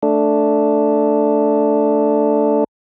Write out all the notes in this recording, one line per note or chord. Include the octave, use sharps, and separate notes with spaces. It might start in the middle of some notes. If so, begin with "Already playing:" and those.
A3 D4